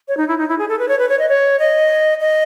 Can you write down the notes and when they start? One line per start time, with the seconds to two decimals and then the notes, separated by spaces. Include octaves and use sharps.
0.08 C#5
0.17 D#4
0.28 E4
0.38 D#4
0.49 E4
0.58 G#4
0.69 A4
0.79 B4
0.88 C#5
0.99 B4
1.09 C#5
1.19 D#5
1.29 C#5
1.59 D#5
2.20 D#5